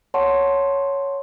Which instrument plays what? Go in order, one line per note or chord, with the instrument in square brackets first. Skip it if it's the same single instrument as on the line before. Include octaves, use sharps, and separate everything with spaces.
[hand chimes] C#5 F#5 A5 C6 C#6